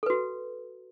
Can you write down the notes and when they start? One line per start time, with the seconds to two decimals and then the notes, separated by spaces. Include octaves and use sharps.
0.03 A4
0.06 B4
0.10 F#4